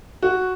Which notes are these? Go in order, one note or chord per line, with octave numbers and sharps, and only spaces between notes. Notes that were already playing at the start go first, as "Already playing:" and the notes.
F#4